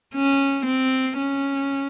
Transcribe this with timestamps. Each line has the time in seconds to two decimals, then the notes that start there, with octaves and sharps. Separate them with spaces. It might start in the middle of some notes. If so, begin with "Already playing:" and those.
0.14 C#4
0.65 C4
1.18 C#4